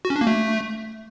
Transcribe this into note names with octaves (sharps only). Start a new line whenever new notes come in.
F#4
C#4
D4
A#3
A3